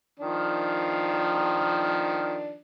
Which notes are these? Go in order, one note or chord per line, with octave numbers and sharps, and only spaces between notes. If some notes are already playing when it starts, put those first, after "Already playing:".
D#3 F3 D4